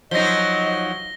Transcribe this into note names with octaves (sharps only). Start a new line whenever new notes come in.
F3 F#3 D#4 D#5 A#6 G7